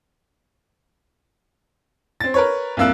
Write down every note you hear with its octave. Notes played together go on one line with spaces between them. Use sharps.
C4 A6
A#4 B4 C#5
C2 F2 A#3 E6 F#6